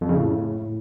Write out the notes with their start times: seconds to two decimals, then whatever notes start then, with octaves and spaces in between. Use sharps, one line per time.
0.01 F2
0.09 C#3
0.16 A2